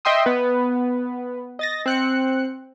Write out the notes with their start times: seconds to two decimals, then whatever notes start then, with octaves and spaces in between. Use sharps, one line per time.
0.05 D#5 E5 G5 C6 D#6
0.26 B3 B4
1.59 D#5 A6 A#6
1.86 C4 F#6 C#7